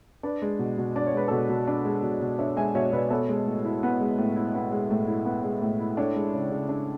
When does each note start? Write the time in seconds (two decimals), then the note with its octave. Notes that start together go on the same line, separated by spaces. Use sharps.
0.23 D4 B4 D5
0.42 G#3
0.59 B2
0.78 B2
0.96 D4 D5
1.06 C#5
1.14 G#3 B4
1.28 B2 A4 C#5
1.49 B2
1.68 D4
1.85 G#3
2.02 B2
2.21 B2
2.39 D4 C#5 E5
2.57 G#3 E5 G#5
2.75 B2 C#5 E5
2.93 B2 B4 D5
3.11 B3 A4 C#5
3.29 G#3
3.46 A2
3.65 E4
3.83 B3
4.00 G#3
4.18 A2
4.36 E4
4.55 B3
4.72 G#3
4.91 A2
5.08 E4
5.25 B3
5.44 G#3
5.62 A2
5.80 E4
5.97 D4 A4 C#5
6.15 G#3
6.34 C#3
6.52 C#3
6.69 D4